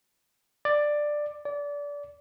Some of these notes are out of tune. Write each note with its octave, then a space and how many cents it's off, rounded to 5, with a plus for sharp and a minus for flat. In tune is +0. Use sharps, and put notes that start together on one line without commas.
D5 +10
D5 -25